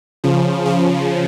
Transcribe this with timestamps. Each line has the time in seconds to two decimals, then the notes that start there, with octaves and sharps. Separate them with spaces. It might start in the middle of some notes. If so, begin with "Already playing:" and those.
0.24 C#3 F3
0.66 C#3 F3